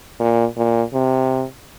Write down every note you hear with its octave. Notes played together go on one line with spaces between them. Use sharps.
A#2
A#2
C3